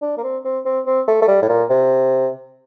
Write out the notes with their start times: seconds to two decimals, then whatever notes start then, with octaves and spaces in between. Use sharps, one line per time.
0.02 D4
0.18 A#3
0.23 C4
0.45 C4
0.65 C4
0.86 C4
1.08 A3
1.22 A3
1.28 G3
1.42 A2
1.49 A#2
1.70 C3